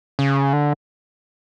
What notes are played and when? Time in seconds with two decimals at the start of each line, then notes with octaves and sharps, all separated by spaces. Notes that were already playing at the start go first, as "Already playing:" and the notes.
0.19 C#3
0.53 D3